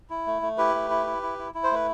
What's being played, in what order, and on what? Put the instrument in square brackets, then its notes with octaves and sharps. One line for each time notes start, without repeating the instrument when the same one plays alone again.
[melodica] E4
A3
A3
E4 G4 B4
A3
E4
E4
E4
E4
E4
C5
A3 B4